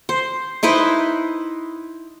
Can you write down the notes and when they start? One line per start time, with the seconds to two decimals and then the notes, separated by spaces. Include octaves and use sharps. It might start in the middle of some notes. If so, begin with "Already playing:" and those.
0.09 C5
0.63 D#4 E4 B4 C5